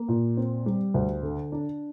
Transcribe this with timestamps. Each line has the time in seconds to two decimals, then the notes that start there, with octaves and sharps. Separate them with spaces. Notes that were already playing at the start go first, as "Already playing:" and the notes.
Already playing: A#3
0.09 A#2
0.37 C4
0.66 G3
0.94 D2
1.23 D3
1.52 D4